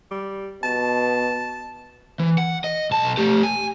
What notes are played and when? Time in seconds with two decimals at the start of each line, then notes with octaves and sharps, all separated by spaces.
0.11 G3
0.63 B2 A5
2.20 E3
2.38 F#5
2.64 D#5
2.91 B1 A5
3.17 A3 G4
3.43 G#5